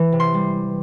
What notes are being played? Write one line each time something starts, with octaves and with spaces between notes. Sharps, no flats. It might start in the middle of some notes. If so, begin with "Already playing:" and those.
Already playing: E3
C3
C6
G3